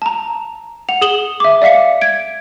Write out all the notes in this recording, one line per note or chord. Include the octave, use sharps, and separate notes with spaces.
A5 A#5
F#5 F7
G#4 D#6 E7 F#7 G7
E5 D6
D5 E5 F5 B6 C#7
G#6 D7